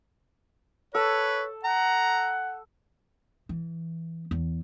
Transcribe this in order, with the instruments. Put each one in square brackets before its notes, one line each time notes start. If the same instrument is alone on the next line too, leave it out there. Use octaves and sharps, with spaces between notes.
[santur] A4 [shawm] B4 [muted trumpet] C#5
[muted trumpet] F#5 [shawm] A#5
[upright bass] E3
E2